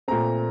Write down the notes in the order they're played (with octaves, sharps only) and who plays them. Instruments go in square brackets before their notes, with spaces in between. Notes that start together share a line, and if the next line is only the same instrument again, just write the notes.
[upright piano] A#2 A3 C4 A#5